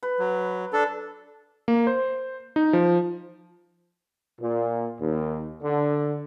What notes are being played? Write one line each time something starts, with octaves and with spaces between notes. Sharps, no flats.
B4
F#3
D4 A4
A#3
C5
D#4
F3
A#2
D#2
D3